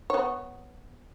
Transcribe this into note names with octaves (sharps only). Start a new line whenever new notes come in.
B3 C#5